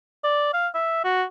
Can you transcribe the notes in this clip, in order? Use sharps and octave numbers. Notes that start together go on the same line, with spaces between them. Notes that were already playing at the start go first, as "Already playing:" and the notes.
D5
F5
E5
F#4